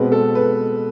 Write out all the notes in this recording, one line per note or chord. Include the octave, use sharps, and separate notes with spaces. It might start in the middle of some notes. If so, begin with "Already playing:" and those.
Already playing: B2 G#3 C4 B4
A4
B4